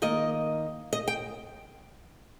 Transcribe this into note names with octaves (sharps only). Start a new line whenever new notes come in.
D#3 A#3 D#5
D#5
G5